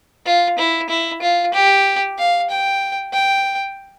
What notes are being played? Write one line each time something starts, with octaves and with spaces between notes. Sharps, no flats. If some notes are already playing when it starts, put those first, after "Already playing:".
F4
E4
E4
F4
G4
F5
G5
G5